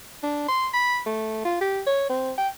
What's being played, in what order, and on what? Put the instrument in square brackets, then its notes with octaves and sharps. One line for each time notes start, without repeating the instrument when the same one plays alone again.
[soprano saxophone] D4
C6
B5
A3
F4
G4
C#5
C4
G5